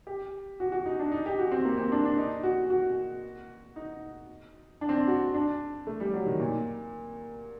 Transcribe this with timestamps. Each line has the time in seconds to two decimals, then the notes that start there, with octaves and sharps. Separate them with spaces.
0.07 G4
0.60 F#4
0.72 F#4
0.86 D#4
0.99 D4
1.12 D#4
1.26 G4
1.39 F#4
1.51 C4
1.65 A#3
1.78 C4
1.92 D4
2.05 D4
2.18 D#4
2.43 F#4
2.70 F#4
3.76 D#4
4.81 D4
4.89 C4
4.97 D4
5.07 F#4
5.34 D4
5.87 A3
6.00 G3
6.14 F#3
6.26 D#3
6.40 A#2